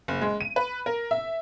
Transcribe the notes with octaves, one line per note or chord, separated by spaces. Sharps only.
F#1
G#3
D#7
B4
A#4
E5